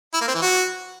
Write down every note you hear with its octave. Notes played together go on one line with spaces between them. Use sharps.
E4
A#3
C4
E3
F#4